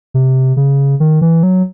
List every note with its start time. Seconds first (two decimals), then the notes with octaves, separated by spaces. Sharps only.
0.14 C3
0.57 C#3
1.00 D#3
1.22 E3
1.43 F#3